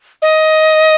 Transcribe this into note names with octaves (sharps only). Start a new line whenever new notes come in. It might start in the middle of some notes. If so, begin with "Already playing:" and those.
D#5